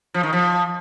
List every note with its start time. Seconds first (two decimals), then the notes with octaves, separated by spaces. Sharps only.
0.14 F3
0.23 D#3
0.33 F3